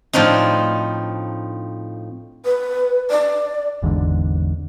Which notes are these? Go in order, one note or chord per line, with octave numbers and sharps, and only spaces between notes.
A2 F3 C4 D4 D#4
B4
D5
G#1 E2 G#2 D3